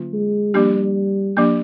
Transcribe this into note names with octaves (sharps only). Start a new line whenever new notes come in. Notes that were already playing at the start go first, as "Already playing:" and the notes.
Already playing: D3 F#3 A#3 C#4 F4
G#3
F3 G3 A#3 D4 G4
F3 A#3 D4 G4